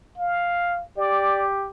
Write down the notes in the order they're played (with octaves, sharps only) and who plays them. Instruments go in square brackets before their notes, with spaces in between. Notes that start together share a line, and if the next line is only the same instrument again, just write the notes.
[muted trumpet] F5
[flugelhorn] G4 [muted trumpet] D5